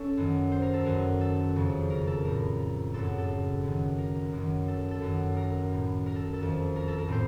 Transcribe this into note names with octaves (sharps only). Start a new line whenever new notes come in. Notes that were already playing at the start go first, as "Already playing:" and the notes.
Already playing: C#4 A4 C#5
F#2 D#3
C5
A#4
A4
F#2 D#3 A#4
A4
F2 C#3
A#4
A4
A2 A#4
F#2 C#3 A4
A4
F#2 D#3
A#4
F#2 D#3
A4
A4
F#2 D#3
A#4
A2
A#4
A4
A4
F2 D#3
A#4
A4
A#4
A2 C4 C5